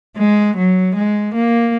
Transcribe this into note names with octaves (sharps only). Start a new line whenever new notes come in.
G#3
F#3
G#3
A#3